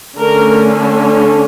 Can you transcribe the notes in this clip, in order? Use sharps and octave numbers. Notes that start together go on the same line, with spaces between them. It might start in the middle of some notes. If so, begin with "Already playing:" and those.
D3 A3 C#4 A#4